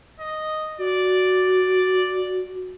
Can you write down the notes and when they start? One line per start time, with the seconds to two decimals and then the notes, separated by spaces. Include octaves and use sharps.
0.20 D#5
0.79 F#4 D5